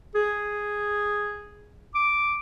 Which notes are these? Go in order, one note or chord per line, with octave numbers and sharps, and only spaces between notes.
G#4
D6